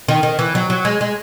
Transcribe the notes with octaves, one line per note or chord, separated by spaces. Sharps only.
D#3
D#3
E3
F#3
F#3
G#3
G#3